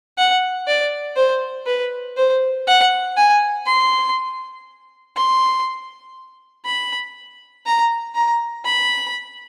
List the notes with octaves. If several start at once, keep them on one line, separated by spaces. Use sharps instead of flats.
F#5
D5
C5
B4
C5
F#5
G#5
C6
C6
B5
A#5
A#5
B5